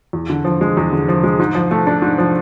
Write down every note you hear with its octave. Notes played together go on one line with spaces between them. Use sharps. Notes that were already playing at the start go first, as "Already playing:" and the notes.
E2
D3
F3
G#3
E2
D3
F3
G#3
G#2
F3
A3
D4
G#2
F3